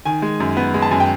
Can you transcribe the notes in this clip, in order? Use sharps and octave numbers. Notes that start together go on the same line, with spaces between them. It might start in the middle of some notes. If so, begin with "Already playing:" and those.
D#3 G#5
G#3
F#2
B3
G#3
A5
F#2 G#5
G5